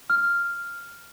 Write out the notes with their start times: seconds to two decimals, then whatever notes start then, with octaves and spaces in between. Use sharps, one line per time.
0.10 F6